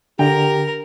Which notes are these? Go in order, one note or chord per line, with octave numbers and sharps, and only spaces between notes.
D3 G4 A#4 G5 A#5